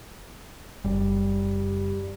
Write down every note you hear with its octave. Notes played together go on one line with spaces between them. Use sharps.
F#1 G3